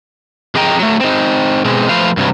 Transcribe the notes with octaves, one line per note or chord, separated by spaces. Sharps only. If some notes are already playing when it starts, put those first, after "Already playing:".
F2 G#4 D#5 G5 A#5
F#3 A3
C4 D#4
B2 G#3 C4
F3 A3 B4 C5 F5
G2 C3 F#3